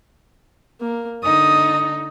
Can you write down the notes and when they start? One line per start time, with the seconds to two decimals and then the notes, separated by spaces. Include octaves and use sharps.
0.81 A#3
1.23 D3 D#4 D#6